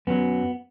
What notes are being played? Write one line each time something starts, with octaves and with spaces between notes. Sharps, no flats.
F#2 F#3 B3